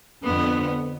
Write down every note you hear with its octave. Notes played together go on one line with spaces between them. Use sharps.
F2 D3 B3